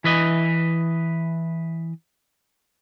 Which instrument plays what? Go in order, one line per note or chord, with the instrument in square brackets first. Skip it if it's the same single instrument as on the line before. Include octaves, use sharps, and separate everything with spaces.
[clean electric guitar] E3 B4 D#5